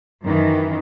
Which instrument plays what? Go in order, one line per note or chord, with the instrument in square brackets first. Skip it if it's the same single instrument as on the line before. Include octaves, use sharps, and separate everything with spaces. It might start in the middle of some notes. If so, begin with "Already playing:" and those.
[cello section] F#2 D#3 E3